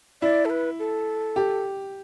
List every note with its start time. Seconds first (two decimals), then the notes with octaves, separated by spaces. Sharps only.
0.22 E4 D5
0.45 A4
0.50 B4
0.79 A4
1.36 G4